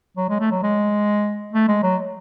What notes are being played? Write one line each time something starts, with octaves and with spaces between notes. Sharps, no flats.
F#3
G#3
A3
F#3
G#3
A3
G#3
F#3